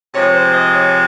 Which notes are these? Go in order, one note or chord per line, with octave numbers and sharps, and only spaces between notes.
C3 F3 G#3 C#5
C5
D#5
C#5